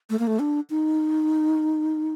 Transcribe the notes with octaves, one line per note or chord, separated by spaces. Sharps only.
A3
A#3
A3
D4
D#4